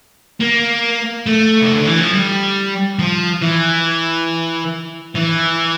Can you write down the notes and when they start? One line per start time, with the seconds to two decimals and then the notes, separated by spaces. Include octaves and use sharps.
0.41 A#3
1.26 A3
1.62 C3
1.74 D3
1.87 E3
2.00 F3
2.13 G3
2.99 F3
3.42 E3
5.15 E3